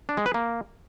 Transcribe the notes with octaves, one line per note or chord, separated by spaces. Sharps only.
D4
G#3
B4
A#3